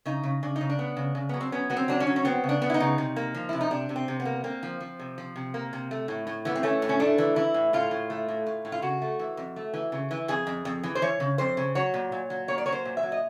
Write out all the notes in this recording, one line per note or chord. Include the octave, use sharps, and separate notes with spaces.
C#3 D#4
C#3
C#3 D4
D#4
C#3
D4
B3
C#3
C#3
F#3 B3
C4
B3 C#4
F#3 B3
C4
F#3 D4
C#4
F#3
C#4
B3 C4
C#3
D4
B3
E4
D#4
C#3
C3
A#3
F3
C3 E4
D#4
C3 D4
C3
C4
C3
B3
A#3
A#3 C4
F3
F3
C3
F3
C3
A#3
C3
A3
A2
A2
E3 B3
C4
A3 C#4
A2
C#4
A3 D4
E3
E3 E4
A2
A2 F4
A2
A3
A2
A2
A2
F4
C#3 F#4
A3
E3
F2
A3
E3
C#3
E3
F2 G#4
F2
F2
E3
C5
E3 C#5
C#3
F2 C5
C#3
F#3 C#5
A#2
A#2
F#3
A#3 C#5
D5
F#3 C#5
C5
A#2
E5
F#3
D#5